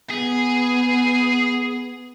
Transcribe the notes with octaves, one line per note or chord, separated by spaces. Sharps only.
B3 G#4